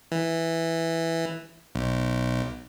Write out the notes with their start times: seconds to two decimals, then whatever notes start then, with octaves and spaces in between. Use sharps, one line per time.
0.12 E3
1.75 B1